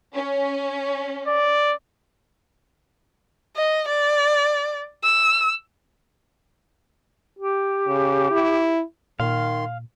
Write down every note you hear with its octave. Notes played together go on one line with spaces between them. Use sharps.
C#4
D5
D#5
D5
E6
G4
C#3
E4
A#2 D#3 F5 C6